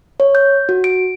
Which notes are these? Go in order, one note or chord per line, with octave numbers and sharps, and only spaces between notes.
C#5
G6
F#4
D7